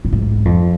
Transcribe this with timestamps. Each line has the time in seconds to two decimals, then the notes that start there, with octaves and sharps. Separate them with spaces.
0.05 A2
0.12 G#2
0.45 F2